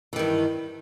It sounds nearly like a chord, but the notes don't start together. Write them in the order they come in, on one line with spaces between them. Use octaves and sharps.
E3 D#3 G2